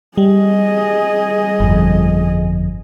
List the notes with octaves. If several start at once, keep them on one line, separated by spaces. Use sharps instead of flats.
G3 G#4 D#5
G1 F2